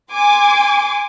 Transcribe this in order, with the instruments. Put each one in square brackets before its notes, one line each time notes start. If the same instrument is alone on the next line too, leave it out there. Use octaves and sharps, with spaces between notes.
[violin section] G#5 C6 D6